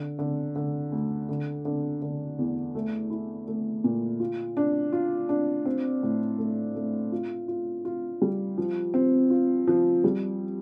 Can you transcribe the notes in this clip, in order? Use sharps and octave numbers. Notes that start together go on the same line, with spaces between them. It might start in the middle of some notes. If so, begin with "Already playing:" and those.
Already playing: D3
D3
D3
D2
D3
D3
D3
E2
A3
E4
A3
A#2
F4
D4
F4
D4
C4
A2
A3
A3
F4
F4
F4
G3
F3
C4
F4
F3
G3